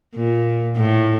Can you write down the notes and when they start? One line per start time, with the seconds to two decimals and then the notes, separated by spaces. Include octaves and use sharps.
0.15 A#2
0.77 A2